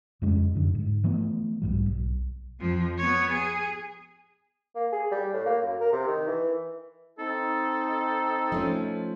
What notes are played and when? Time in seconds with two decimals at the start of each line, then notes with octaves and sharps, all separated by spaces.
0.22 F2 C#3 G#3 C#4
0.55 F#2 D3
0.75 G#2
1.04 E3 F3 A3 B3
1.62 B1 G#2 G3
1.86 B1
2.60 F2 F3
2.98 B3 C#5
3.32 G#4
4.75 A#3
4.92 G#4
5.11 G3
5.33 A2
5.45 A#3
5.62 F#2
5.80 A#4
5.92 C3
6.07 D#3
6.27 E3
7.19 C4 D#4 A4
8.52 F3 A3 C#4